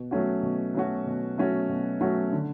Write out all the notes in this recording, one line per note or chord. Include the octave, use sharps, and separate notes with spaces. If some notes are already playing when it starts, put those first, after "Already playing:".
Already playing: B2
F#3 A3 C#4 F#4
B2
F#3 A3 C#4 F#4
B2
F#3 A3 C#4 F#4
B2
F#3 A3 C#4 F#4
D3